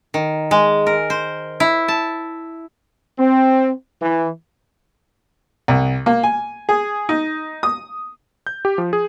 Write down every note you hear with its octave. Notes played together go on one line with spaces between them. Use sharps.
D#3
G#3
A#4
C5
E4
A5
C4
E3
C2
A#3
G#5
G#4
D#4
D#6
G6
G4
F3
G#4